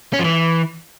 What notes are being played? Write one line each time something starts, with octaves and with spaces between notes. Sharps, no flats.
C#4
F3
E3